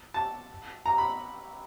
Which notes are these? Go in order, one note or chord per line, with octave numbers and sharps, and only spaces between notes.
A5
A#5
B5